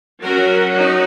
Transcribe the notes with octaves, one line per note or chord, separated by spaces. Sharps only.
F#3 C#4 F#4 A#4
D#4 F#4